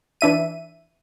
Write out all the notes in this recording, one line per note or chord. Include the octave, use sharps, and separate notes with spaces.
E3 D4 E5 D#7